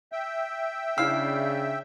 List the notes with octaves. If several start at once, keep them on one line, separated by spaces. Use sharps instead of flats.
E5 G5
C#3 D4 E4 F5 E6